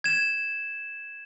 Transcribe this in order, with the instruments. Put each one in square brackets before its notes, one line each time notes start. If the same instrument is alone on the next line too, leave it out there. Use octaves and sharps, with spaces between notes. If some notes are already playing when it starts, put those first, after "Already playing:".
[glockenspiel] G#6 E7